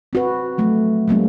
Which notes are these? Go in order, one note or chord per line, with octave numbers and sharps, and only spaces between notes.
C4 F#4 B4
F3 F#3 A3
F#3 G#3 A#3 C#4